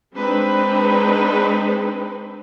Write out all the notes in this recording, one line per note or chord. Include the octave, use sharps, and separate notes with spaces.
G#3 C4 D4 D#4 B4